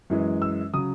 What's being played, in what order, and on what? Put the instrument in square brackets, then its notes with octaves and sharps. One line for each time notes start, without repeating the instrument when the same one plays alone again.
[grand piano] F#2 E3 G#3
E6
C#3 F#3 D#6